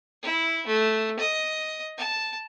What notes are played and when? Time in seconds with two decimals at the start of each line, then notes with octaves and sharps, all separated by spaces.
0.22 E4
0.67 A3
1.19 D#5
1.97 A5